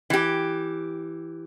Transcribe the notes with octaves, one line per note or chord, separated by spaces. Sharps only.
E3 G4